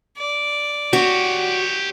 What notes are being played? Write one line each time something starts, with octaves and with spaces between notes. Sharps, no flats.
D5
F#4 G4 C#5